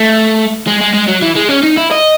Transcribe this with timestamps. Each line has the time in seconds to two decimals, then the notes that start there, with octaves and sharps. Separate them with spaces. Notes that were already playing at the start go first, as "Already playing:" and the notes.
Already playing: A3
0.67 G#3
0.81 G#3
0.94 G#3
1.08 F#3
1.22 E3
1.36 G#3
1.49 C#4
1.63 D#4
1.77 E4
1.91 D#5